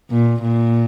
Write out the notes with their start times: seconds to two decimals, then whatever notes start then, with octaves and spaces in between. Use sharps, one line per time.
0.10 A#2
0.42 A#2